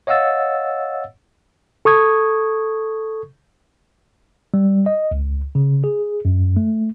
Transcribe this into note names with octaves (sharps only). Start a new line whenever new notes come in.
C#5 D#5 F5 F#5 E6 A6
A4 C#6 D#6 G#6
G3
D#5
C#2
C#3
G#4
F#2
A3